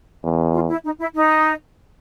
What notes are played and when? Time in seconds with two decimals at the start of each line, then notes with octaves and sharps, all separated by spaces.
0.23 E2
0.54 F4
0.69 E4
0.84 D#4
0.99 E4
1.15 D#4